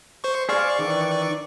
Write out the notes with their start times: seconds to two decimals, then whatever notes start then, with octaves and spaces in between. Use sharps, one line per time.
0.24 C5 C#6
0.49 G#4 C5 D5 F5 C#6
0.79 D#3 E3 D4